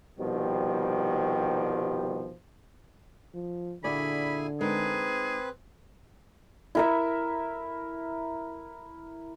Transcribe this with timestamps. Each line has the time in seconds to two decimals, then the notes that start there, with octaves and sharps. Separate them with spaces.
0.19 C2 B2 D#3 F3 G3
3.34 F3
3.84 A#2 D3 E4 F#4 G#4 D5 G#5 B5
4.61 G#3 C4 D#4 G#4 A#4 B4
6.75 E4 A#4 E5